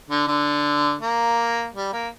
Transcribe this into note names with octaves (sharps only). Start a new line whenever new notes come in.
D3
D3
A#3
G3
A#3